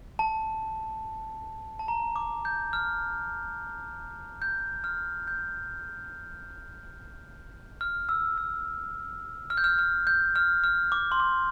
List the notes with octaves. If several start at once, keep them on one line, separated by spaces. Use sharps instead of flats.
A5
A5
A#5
D6
G6
F6
G6
F6
G6
F6
E6
E6
F6
G6
F6
F6
G6
F6
F6
D6
C6
D6